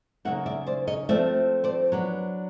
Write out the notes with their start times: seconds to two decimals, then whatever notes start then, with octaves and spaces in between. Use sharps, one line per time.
0.25 C#3 F#3 A#3 D#4 E5 F#5
0.46 D5 E5
0.67 C5 D5
0.87 C#5 D#5
1.09 F3 A3 C4 F4 D5 E5
1.64 C5 D5
1.92 F#3 B3 D4